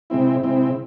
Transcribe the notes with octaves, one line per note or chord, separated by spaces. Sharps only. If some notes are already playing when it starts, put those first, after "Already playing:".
C3 G#3 C4 E4
C3 G#3 C4 E4